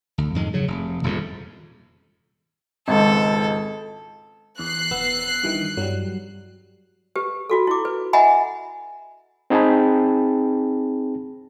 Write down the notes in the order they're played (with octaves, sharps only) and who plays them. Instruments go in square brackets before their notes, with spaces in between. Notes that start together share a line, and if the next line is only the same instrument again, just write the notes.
[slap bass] D2
F2 G#2 G#3
C#3 F#3
F1
D#1 F2 G#2
[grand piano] G#1 C#2 [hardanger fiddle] A4
[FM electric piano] E2 [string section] F#6 C7
[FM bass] D#1 [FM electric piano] B3 E6
[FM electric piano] G2 D#3 E3
[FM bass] G2 [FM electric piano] F#3 G3
[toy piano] G4 B4
F4 F#4 A4
E4 D6
B4
D#5 E5 F#5 G#5 A#5 B5
[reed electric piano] C4 D#4 G#4 G5 A5 B5